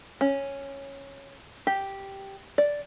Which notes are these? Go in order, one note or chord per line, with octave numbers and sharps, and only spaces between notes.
C#4
G4
D5